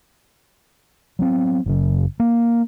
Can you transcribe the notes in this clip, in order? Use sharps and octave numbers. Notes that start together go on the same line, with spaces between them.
F#3 B3 C4
F#1 C#3
A#3